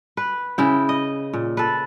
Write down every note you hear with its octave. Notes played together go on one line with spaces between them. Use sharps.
B4
C#3 E4 G5
D#5
A#2
A4 B4